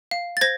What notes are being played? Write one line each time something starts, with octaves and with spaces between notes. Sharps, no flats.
F5
A6
C5 G#6 A#6